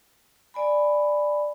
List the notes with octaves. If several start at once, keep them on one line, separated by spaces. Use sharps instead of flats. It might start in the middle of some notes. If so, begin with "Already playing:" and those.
D5 G#5 B5